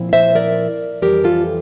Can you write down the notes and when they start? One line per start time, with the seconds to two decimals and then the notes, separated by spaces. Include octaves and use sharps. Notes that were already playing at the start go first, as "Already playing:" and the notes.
Already playing: A#2 F3 C4 E4
0.13 C5 E5
0.35 A#4 D5
1.02 F2 E3 G3 G4 A#4
1.24 F4 A4